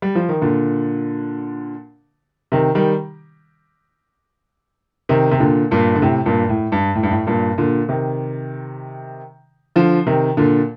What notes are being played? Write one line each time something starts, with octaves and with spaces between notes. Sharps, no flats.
G3
F3
D#3
A#2 D3
C3 D#3
D#3 G3
C3 D#3
C3
A#2 D3
G2 A#2
D3
A2 C3
G2 A#2
A2
G2
A2
G2
A2
G2 A#2
A#2 D3
C3 D#3
D3 F3
C3 D#3
A#2 D3